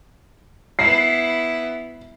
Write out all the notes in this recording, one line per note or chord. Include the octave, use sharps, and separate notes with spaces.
B3 E4 C7